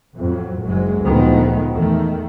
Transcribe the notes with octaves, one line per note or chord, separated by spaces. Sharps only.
F2 A2 F#3
F#1 G#2 F#3 G#3
D2 A#2 D#3 F3 G#3 B3
E2 D#3 A3